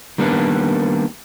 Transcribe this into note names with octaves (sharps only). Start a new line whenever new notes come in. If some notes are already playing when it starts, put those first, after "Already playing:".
D#3 G3 A#3 B3 D4